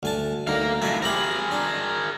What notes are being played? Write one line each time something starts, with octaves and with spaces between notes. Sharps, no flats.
D2 G#5 A5
D2 D#4 A#4 F5
F2 A2 E5 G#5
C4 G4 G#4 A#4 B5
D4